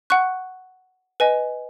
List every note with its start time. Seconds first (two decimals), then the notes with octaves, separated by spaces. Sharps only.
0.10 F#5 C#6 F#6
1.20 B4 D#5 G#5